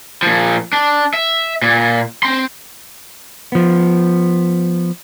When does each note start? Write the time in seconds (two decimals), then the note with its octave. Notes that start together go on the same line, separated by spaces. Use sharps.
0.23 A#2 F3
0.73 D4
1.14 E5
1.62 A#2
2.23 C4 C6
3.52 F3 B3